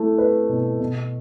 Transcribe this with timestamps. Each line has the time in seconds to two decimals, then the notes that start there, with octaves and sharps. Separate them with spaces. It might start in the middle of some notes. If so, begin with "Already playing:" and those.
Already playing: A3 E4
0.18 B4
0.49 B2
0.80 B2